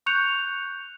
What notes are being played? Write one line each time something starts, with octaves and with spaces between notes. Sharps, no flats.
C#6 F#6 G6 C#7 F7